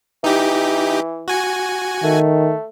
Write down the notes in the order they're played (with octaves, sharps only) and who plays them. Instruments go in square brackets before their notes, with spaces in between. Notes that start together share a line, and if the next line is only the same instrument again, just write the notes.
[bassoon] E3 [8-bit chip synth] D#4 G4
[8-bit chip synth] F#4 G#5
[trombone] D#3 [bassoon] A3